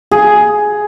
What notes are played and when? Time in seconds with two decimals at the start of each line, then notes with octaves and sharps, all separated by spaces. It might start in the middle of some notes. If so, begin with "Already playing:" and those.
0.11 G#4